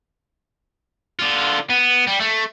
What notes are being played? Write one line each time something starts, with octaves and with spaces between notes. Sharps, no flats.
D3 F4
B3
G3
A3